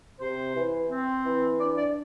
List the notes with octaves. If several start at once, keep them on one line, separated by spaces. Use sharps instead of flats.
C3 C5
E3
C4
E3
D4 D5
D5